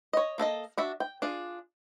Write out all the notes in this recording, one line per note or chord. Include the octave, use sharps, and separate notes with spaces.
C#5 D#5
A#3 A4 A#4 D#5
D4 F#4 E5
G5
D4 F4 G#4